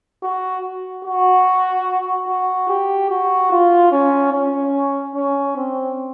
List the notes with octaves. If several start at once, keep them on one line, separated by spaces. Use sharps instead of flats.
F#4
F#4
F#4
G4
F#4
F4
C#4
C#4
C#4
C4